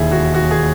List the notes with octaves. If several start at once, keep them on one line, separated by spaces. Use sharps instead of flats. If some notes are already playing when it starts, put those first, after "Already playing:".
Already playing: E1 D#2 D#3 E4 G#4
F#4
F#4
G#4